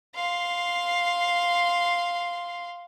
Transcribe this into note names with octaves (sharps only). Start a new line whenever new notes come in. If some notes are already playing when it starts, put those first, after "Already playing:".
F5 C6